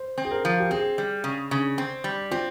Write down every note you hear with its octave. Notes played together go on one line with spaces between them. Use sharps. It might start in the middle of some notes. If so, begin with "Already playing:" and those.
Already playing: C5
C4
G#4
A#4
F3
G4
C4 G#4
G3
C#3
C#3
C4
G3
C4 F4